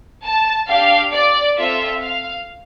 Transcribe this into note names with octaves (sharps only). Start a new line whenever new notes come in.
A5
D4 G4 F5
D5
C4 F4 A4 E5
F5